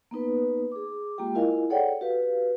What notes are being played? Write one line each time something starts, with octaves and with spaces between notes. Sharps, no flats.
A#3 B3 D#4 B4
G#4 D6
G#3 A#3 F4 G4 G5
E4 F4 A#4 D#5 F5 G#5
G#4 A4 C#5 D5 F#5 G5
F#4 G4 B4 F5